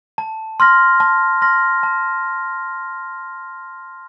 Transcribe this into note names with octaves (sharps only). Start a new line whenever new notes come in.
A5
C6 F6 A#6
A5
C6 F6 A#6
A5